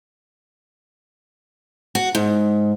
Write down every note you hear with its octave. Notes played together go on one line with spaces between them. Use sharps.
F#4
G#2